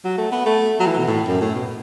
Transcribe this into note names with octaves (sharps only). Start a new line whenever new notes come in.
F#3
A3
B3
A3
F#3
E3
B2
A2
F#2
A2
B2